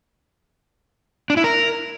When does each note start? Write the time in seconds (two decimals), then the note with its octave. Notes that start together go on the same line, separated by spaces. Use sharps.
1.30 D4
1.37 E4
1.44 A#4